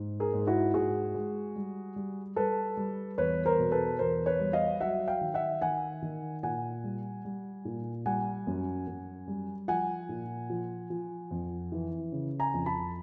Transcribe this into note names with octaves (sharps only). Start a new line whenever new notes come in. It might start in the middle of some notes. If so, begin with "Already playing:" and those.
Already playing: G#2
G#4 A#4
G#2
E4 F#4
G#2 F#4 G#4
G#3
G3
G3
G3 A4 B4
G3
E2 B4 C#5
A#4 C5
B2
A4 B4
E2 A#4 C5
B4 C#5
G3
D#5 F5
F#3 E5 F#5
F5 G5
D#3
E5 F#5
D#3 F#5 G#5
D#3
A#2 F#5 G#5
G3
G3
A#2
G3 F#5 G#5
F#2
F#2
G3
F3 F#5 G#5
A#2
F3
F3
F2
E3
C#3
G#5 A#5
F2
A5 B5